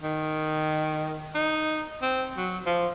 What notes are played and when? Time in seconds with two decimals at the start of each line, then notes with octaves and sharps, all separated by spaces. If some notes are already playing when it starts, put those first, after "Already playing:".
0.03 D#3
1.35 D#4
2.02 C4
2.37 F#3
2.66 F3